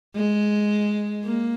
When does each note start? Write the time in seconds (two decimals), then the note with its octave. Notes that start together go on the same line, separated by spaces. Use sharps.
0.16 G#3
1.24 A#3